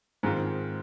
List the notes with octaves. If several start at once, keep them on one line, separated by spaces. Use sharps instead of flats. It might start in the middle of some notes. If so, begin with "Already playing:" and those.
G#2 D#3 G#3 C4 F4